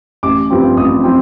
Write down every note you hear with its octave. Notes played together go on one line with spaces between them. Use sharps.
A1 D6
G2 F3 C4
A1 D#6
F3 C4